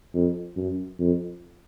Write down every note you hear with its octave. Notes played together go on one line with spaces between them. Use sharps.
F2
F#2
F2